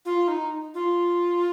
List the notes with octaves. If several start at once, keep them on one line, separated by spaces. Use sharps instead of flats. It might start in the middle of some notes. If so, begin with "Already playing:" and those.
F4
D#4
F4